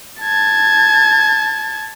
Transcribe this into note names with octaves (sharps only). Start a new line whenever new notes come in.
A5 G#6